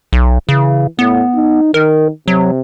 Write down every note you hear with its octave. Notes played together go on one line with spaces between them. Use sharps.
B1
C#3 E3
A2 B3
D#4
D#3 A#4
C3 F#3